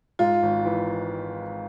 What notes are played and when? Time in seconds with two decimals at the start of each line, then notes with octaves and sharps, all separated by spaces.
0.19 G#2 F4
0.43 G#1
0.65 E3